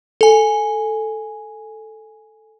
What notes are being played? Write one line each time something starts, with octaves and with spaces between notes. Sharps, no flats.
A4 G#5